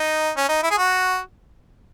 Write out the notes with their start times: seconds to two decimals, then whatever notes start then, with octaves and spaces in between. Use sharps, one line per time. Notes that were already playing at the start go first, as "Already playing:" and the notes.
Already playing: D#4
0.37 C#4
0.49 D#4
0.63 E4
0.71 G#4
0.78 F#4